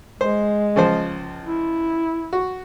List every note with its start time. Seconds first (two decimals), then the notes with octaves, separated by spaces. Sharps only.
0.21 G#3 C5
0.76 C#2 F3 C5
1.44 E4
2.33 F#4